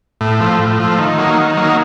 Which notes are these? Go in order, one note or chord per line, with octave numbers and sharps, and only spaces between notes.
A2
F3 A3
A2
F3 A3
D#3
F#3 A#3 D#4
D#3
F#3 A#3 D#4